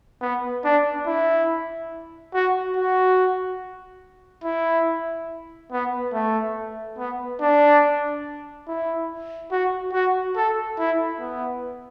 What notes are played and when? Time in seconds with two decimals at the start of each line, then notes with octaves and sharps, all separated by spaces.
0.21 B3
0.64 D4
1.07 E4
2.34 F#4
2.76 F#4
4.44 E4
5.72 B3
6.13 A3
6.98 B3
7.41 D4
8.68 E4
9.52 F#4
9.93 F#4
10.36 A4
10.79 E4
11.20 B3